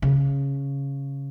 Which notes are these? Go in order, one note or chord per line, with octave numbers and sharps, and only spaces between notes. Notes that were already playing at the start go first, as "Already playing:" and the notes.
C#3